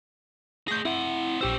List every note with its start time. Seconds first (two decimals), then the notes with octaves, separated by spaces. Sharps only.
0.68 A3 G#4 G6 A#6
0.85 C4 E4 F#5
1.41 A#1 C#4 G4 C5 E6